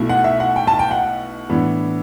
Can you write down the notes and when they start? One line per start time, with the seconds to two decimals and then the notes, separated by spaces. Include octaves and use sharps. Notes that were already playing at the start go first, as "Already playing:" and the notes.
Already playing: B1 B2 A3 E4
0.09 F#5
0.24 E5
0.40 F#5
0.56 G5
0.67 A5
0.79 G5
0.91 F#5
1.49 A2 E3 B3 D4